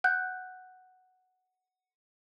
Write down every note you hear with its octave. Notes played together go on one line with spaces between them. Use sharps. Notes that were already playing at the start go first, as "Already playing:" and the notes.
F#5 F#6 G6